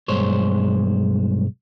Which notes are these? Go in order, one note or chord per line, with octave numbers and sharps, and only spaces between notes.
B1 G2 G#3 C5 C#5